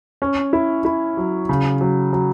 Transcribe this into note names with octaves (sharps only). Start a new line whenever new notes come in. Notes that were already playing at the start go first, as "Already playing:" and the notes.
C#4
E4
E4
F#3
C#3
F#3
F#3